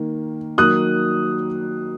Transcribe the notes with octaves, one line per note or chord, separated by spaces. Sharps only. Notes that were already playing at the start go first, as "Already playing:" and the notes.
Already playing: D#3 A#3
D#3 F#3 A#3 D#6 F#6